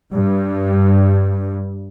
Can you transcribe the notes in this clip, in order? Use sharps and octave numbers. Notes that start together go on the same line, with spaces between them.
G2